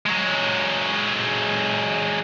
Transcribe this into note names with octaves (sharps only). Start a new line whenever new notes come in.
F#3 G#3